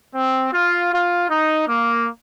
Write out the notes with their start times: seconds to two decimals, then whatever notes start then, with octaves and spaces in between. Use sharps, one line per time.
0.15 C4
0.53 F4
0.91 F4
1.29 D#4
1.67 A#3